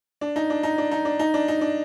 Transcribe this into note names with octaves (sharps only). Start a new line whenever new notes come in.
D4
D#4
D4
D#4
D4
D#4
D4
D#4
D4
D#4
D4